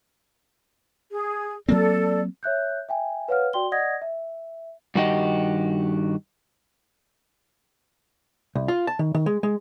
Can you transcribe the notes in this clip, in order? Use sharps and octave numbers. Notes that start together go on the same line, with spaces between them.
G#4
F#3 A#3 C4 A4 D5
C#5 E5 F#6 G6
E5 G5 G#5
B4 C#5 F5 F#5 F6
F#4 D5 G5 C6 G7
D5 D#5 F#5 D#6 G#6 A#6
E5
G2 D#3 F#4 G4 D#5
C2
F4
A5
D#3
D#3
G#3
G#3